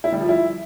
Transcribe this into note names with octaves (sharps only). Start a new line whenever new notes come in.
E4
G3
F3
E4